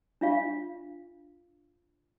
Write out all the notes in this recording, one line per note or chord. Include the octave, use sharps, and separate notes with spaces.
D4 F4 F5